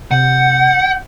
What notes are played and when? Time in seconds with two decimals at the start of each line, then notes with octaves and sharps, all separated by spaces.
0.11 C3 F#5 G6